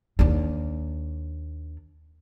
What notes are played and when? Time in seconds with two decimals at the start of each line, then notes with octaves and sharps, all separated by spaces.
0.19 D#2 D4